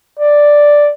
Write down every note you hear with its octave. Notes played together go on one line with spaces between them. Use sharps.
D5